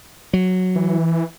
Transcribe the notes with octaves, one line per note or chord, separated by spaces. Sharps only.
F#3
E3